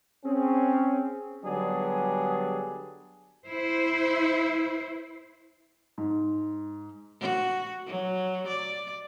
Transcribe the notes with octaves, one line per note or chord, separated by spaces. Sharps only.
C4 C#4 G#4
D3 F#3 G3 B3 D4 G#4
E4 C5
G#2
F#4
F#3
D5